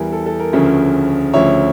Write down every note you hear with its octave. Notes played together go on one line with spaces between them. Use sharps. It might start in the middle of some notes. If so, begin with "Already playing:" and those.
Already playing: E2 E3 G3 A#4
A4
A4
A#4
D2 C#3 F3 A3 C#4
D2 C#3 F3 C#5 E5